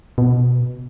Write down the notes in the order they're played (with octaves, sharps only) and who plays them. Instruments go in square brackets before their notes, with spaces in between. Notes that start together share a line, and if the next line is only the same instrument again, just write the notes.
[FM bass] B2